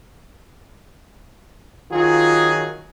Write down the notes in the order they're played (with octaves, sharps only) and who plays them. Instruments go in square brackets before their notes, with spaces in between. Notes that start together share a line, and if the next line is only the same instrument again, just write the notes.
[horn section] D#3 F#3 G#4 [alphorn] F4